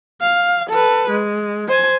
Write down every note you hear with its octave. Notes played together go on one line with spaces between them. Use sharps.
F5
A4 B4
G#3
C5 G#5